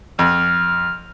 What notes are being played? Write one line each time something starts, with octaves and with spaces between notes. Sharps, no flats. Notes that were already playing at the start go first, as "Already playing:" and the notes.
F2 F6